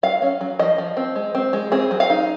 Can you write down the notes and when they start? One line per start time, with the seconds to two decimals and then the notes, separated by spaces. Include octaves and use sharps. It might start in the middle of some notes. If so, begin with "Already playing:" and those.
0.03 F#3 F5
0.22 C#4
0.41 F#3
0.59 F3 D#5
0.78 F3
0.97 C4
1.16 G#3
1.35 C4
1.53 G#3
1.72 C4 G#4
1.91 F#3
2.00 F5
2.10 D#4